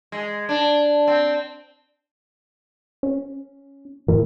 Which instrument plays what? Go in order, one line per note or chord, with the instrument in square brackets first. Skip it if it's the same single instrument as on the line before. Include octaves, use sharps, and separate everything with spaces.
[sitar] G#3
D4
C4
[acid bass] C#4
[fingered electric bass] A2 E3 [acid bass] A#4